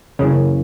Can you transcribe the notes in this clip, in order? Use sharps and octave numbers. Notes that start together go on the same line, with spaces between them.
F#2 C#3 E3 A#3